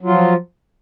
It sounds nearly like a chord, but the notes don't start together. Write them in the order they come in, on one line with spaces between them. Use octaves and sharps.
F#3 F4 F3